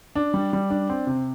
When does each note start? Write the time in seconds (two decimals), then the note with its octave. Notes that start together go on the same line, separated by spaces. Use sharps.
0.16 D4
0.34 G3
0.53 G3
0.70 D4
0.89 C4
1.07 C3